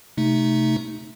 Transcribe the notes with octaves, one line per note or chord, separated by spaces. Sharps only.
C3 A3 D#4